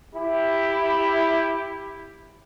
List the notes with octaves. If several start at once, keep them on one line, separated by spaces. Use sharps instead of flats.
E4 G4